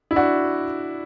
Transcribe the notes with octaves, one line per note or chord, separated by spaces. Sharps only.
E4
D4 F#4